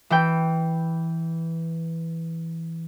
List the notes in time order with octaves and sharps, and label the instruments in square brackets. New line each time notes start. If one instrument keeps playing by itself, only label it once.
[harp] E3 G5